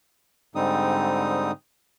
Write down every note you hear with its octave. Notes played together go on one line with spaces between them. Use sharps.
G#2 D3 G3 C4 D#4 D#6